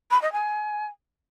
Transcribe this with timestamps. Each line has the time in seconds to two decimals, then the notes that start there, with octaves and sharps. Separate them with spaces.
0.11 B5
0.22 D#5
0.32 G#5